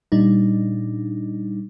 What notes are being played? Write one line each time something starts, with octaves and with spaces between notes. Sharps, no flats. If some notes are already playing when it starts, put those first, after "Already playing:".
A#2 G3 D4 D#4